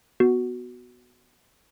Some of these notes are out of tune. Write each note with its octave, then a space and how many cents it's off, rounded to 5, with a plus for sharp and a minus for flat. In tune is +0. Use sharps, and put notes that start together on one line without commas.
B3 +0 F#4 -5